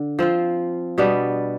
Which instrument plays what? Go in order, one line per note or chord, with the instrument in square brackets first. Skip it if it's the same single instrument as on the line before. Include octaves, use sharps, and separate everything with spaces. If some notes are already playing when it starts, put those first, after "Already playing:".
Already playing: [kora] D3
F3 C4 F4
B2 G3 B3 D4